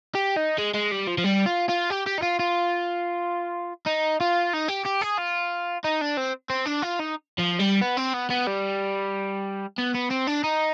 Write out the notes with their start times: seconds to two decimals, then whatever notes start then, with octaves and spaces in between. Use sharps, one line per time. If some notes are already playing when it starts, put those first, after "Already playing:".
0.15 G4
0.37 D#4
0.58 G#3
0.74 G#3
0.92 G3
1.07 F3
1.18 F3
1.24 G3
1.46 F4
1.69 F4
1.90 G4
2.06 G4
2.18 D#4
2.22 F4
2.39 F4
3.86 D#4
4.21 F4
4.53 D#4
4.69 G4
4.86 G4
5.02 G#4
5.18 F4
5.84 D#4
6.01 D4
6.17 C4
6.50 C4
6.66 D4
6.82 F4
6.99 D#4
7.38 F3
7.59 G3
7.81 B3
7.97 C4
8.14 B3
8.30 B3
8.47 G3
9.78 B3
9.95 B3
10.11 C4
10.27 D4
10.44 D#4